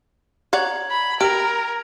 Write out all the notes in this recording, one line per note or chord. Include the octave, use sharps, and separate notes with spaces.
C#5 D5 F#5 A#5 G#6 F#7
B5
G4 A#4 F6 D7